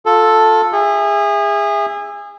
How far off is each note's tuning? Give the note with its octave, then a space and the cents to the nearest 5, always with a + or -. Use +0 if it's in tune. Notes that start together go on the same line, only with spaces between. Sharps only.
F4 +20 A4 +0
G#4 -25 E5 +0